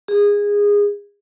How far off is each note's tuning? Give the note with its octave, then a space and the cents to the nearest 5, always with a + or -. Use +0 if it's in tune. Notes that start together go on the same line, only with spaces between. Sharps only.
G#4 -20